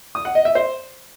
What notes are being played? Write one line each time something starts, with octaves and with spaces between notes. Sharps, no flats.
D#6
F#5
D#5
E5
C5